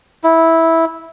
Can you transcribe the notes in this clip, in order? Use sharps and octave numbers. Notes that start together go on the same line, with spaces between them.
E4